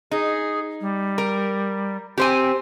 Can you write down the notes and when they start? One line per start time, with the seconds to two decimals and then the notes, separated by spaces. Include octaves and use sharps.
0.11 D#4 G#4
0.81 G3
1.18 A#4
2.18 C4 G4 C5 G#5